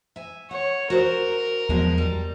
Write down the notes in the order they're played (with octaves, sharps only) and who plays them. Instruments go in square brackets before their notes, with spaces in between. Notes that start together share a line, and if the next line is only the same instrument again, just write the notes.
[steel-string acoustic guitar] E5 G#5
[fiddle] C#5 [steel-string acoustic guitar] F#5
[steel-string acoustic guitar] F#4 C5 [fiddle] A#4
[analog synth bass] E2 [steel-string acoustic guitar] F3 F#3 G#3
[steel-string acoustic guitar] G3